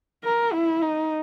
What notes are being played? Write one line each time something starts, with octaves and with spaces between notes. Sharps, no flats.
A#4
E4
D#4